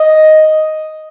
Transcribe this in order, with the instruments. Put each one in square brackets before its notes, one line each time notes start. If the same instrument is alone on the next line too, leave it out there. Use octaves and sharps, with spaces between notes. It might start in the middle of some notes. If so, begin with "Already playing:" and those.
Already playing: [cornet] D#5